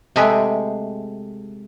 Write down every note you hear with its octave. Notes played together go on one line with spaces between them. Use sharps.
C3 G#3 A3 G4 G#4 B4